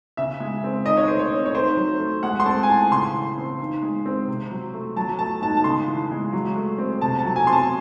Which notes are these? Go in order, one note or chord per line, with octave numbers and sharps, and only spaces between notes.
C#3 E5
G#3
C4
D#3 D#5
C#5
A3 C5
C#5
C4
C#5
D#3 C5
F#3
A3
G#3 F#5
C6
C4 A5
G#5
A2 A5
C#3 C6
E3
C4
D#3
G#3
C4
C3
F#3
A3
F#3 A5
A3 A5
G#2 A5
A5
C#3 C6
E3
G#3
F#3
A3
C4
C3 A5
A5
F#3
G#5
C4 C6
A5